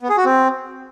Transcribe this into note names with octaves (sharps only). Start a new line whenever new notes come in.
B3
G#4
F#4
C4